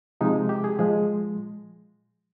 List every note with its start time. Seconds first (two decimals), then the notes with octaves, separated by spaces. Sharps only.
0.21 C3 F3 G#3 D#4
0.49 G4
0.64 G#4
0.79 A#2 F3 G#3 G#4